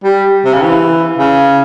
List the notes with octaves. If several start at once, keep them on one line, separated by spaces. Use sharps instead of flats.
G3
C3
C#3
E3
C#3